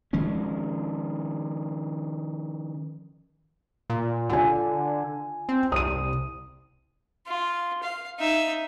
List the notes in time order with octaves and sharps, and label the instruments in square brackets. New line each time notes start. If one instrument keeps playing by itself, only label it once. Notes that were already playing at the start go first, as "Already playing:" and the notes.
[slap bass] D#3 F3 G#3 C#4
[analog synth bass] A#2
[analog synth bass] D3 [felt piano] F4 G#5
[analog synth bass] C4
[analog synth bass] C2 [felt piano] D#6 D#7
[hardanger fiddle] F4
F5
D#4 E5